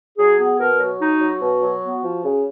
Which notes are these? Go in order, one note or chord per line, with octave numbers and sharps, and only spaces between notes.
F#3 G#4
B3 G#4
B2 A#4
F#3 F#4
D#4
F#3
B2
F#3
B3
F3
C#3